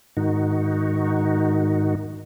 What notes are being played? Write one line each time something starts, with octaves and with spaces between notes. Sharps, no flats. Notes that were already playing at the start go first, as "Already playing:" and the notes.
G#2 D#3 D#4 F#4